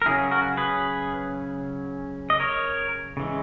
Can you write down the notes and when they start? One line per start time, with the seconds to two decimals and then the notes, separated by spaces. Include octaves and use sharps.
0.02 A#4
0.06 C#3 F#3 C#4 E4 G#4
0.31 F#4 A#4
0.57 G#4 B4
2.30 D#5
2.40 A#4 C#5
3.17 C#3 E3 G#3